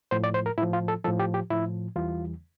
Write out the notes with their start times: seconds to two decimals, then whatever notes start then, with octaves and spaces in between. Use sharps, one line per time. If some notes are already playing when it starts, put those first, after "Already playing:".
0.11 A2 F3 C5
0.24 D5
0.34 C5
0.46 A#4
0.58 A2 E4
0.62 F3
0.73 F4
0.88 A4
1.04 A2 F3 A4
1.19 G4
1.34 G4
1.50 A2 F3 E4
1.96 E2 E3 G3 F4